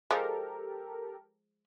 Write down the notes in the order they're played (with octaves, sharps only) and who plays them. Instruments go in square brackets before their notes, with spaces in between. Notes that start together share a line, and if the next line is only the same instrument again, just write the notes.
[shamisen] F3 G#3 [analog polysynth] G4 A4 A#4